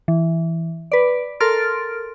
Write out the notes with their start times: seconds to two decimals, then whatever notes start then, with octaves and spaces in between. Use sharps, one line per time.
0.08 E3
0.92 B4 D5
1.40 A4 A#4 C6 F6 A6 D7